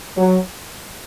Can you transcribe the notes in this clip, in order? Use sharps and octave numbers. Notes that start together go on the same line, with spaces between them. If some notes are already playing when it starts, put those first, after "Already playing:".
F#3